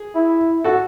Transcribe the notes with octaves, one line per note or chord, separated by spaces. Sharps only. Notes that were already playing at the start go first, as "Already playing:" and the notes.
Already playing: G#4
E4
F#4 A4